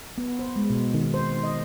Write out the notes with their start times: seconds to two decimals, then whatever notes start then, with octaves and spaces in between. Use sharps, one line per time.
0.18 B3
0.39 C5
0.56 G#3
0.70 B2
0.94 D#3
1.14 C5
1.43 D#5